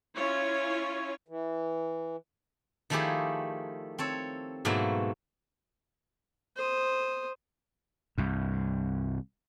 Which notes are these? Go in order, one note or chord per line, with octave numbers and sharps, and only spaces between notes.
C#4 E4 F4 C#5
E3
D#3 F3 A3 E4 G4 G#4
C4 A4 C#5
G#2 B2 F#3 A3 A#3 E4
C5 D#6
C2 G2